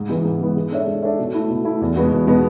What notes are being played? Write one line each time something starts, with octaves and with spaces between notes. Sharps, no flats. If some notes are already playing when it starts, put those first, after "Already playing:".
Already playing: G#2
E3 G#3 B3
G#2
E3 G#3 B3
G#3
D4 A4 C#5 E5
G#3
D4 A4 C#5 E5
B2
A3 E4
B2
A3 E4
E2
B2 G#3 B3 F#4
E2
B2 G#3 B3 F#4